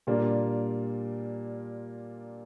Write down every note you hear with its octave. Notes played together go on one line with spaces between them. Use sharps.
A#2 G3 A#3 D4 F4